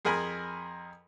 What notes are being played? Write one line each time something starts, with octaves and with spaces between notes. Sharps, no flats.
F2 G#4 A#4 G#5 B5